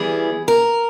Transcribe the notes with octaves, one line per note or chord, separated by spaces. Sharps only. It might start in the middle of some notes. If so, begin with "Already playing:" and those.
Already playing: E3 G3 B3 E4 G#4
A#4